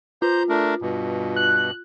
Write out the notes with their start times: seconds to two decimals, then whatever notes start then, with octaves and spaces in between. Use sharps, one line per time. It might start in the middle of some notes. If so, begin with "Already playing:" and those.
0.22 F4 C5 A#5 G6
0.49 A3 D4 A#4
0.82 G2 B2
1.36 F#6